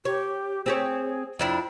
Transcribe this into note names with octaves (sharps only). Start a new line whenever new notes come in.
G4 C#5
C4 G4 G#4 C#5
F2 D4 E4 G5